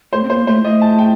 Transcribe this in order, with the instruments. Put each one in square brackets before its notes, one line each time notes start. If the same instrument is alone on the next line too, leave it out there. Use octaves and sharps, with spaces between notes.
[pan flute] A3 [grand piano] C5
[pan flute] C4
[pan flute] A#3 [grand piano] C5
[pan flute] A3 [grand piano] C5
[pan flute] A3 [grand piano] D#5
[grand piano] A5
G5